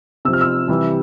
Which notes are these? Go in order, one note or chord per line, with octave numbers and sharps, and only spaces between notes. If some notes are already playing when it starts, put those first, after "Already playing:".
C3 F3 E6
F6
E6
C3 E3 G3